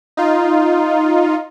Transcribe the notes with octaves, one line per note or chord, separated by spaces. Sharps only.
D#4 F4